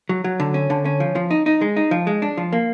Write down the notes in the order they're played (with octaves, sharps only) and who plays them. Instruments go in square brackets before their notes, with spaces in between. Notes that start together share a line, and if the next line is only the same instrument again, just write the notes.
[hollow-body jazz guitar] F#3
F#3
D3
C#4
D3
C#4
F3
F3
D#4
D#4
G#3
D#4
F3
G#3
D4
F3
A#3